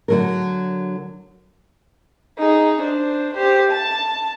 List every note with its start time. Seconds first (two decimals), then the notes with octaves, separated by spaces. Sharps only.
0.08 D3 F#3 A#4
2.39 D#4 G#4
2.82 D4 C5
3.34 G4 C5
3.71 A5